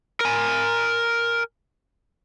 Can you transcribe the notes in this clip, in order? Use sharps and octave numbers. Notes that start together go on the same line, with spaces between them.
A#4 G#5